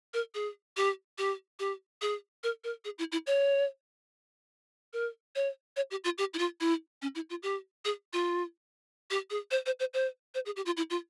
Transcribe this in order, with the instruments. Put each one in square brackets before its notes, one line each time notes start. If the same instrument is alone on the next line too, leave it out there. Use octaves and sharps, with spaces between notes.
[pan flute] A#4
G#4
G4
G4
G4
G#4
A#4
A#4
G#4
E4
E4
C#5
A#4
C#5
C#5
G4
F4
G4
E4
F4
E4
C#4
E4
F4
G4
G#4
F4
G4
G#4
C5
C5
C5
C5
C5
G#4
G4
F4
E4
F4